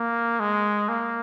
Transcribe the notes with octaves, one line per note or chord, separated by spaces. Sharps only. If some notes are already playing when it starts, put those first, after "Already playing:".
Already playing: A#3
G#3
A#3